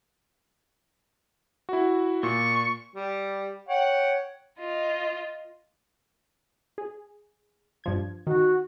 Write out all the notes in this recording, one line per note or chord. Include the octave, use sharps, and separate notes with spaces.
E4 F#4
A#2 C#6
G3
C#5 F#5 G5
F4 D#5
G#4
G2 F3 G#6
D#3 F#4